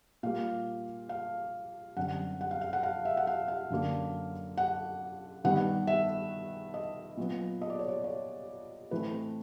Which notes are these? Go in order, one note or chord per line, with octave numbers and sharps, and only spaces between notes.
A#2 G3 A#3 F5
F5
F#2 D3 G3 C4 F#5
F#5
F5
F5
F#5
F5
E5
F#5
F5
F5
F#2 D3 F#3 A#3
F#5
G2 D#3 G3 B3 F#5
E5
D#5
A#2 F#3 B3
D#5
D5
C#5
D5
C#5
A2 E3 A3 C4 B4